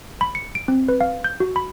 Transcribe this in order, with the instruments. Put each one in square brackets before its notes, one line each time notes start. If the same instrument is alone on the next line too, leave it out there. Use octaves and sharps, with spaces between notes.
[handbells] B5
C#7
D7
C4
B4
F5
G6
F#4
B5